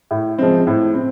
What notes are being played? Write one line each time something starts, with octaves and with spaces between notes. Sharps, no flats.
A2
F3 G#3 C4
A2
C4